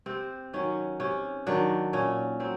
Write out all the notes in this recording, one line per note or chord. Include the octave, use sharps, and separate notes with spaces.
C3 C4
D#3 F#3 C#4
C3 C#4
D#3 F#3 D4
A#2 C#4
F#3 C4